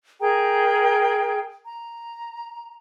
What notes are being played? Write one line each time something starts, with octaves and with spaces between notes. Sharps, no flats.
G#4 A#4 G5 A#5
A#5